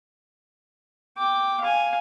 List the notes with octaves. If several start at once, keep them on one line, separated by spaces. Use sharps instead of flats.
G5 D6
F5 G#5